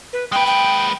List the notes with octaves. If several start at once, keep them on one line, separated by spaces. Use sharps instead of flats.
B4
G#3 B4 G5
G5